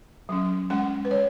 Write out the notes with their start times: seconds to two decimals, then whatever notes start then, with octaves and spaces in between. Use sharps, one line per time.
0.29 F#3 C#4
0.70 G#3 C#4 F#5
1.05 B4
1.11 G#3 C#5